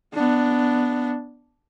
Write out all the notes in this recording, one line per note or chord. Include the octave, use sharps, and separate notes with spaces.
B3 D4